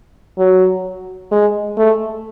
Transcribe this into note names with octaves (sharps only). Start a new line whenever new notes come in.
F#3
G#3
A3